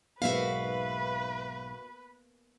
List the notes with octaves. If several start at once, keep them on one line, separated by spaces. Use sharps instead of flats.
B1 G#2 A#3 B3 F#4 B4 E5 F5